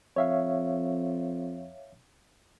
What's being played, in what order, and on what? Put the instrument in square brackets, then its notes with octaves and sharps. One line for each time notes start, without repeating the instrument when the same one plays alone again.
[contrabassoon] F2 [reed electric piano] C#5 E5 F5